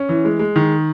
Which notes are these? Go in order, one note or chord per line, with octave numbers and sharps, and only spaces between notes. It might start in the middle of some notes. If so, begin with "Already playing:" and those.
Already playing: C#4
E3
G#3
G#3
D#3